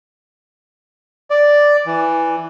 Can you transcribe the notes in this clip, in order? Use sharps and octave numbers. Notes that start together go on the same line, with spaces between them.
D5
E3